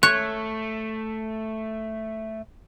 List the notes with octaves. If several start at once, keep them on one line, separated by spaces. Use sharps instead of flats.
A3 C#5 F#6